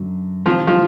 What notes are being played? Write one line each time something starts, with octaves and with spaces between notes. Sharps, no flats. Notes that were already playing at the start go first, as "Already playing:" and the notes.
Already playing: F#2 D3 F#3
D2 C3 D#3 F3 F#3 F4
F3 F4